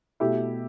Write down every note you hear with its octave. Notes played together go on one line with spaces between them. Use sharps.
B2 A3 E4 G4